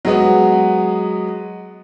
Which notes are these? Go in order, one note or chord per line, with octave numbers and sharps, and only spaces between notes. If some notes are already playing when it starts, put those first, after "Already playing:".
F#3 G#3 B3